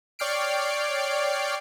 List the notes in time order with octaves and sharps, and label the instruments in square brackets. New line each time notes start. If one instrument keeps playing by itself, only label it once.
[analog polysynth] C#5 D5 G5 F6 C7 D7